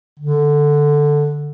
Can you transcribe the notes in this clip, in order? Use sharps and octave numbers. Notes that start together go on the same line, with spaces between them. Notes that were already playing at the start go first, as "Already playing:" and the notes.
D3